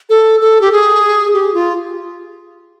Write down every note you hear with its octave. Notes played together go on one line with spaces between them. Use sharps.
A4
A4
G4
G#4
G4
F4